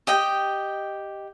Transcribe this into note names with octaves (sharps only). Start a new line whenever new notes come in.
G4 D#5 G5